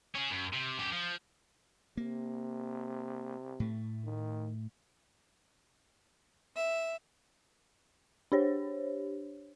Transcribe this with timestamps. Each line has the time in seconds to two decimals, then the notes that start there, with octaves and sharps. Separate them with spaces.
0.15 C#4 G#4
0.30 F#2
0.53 C3
0.78 F#2 G4
0.92 F3
1.97 C3 A#3
3.60 A2 A3
4.05 D#3
6.55 E5
8.32 D4 G4 C5 C#5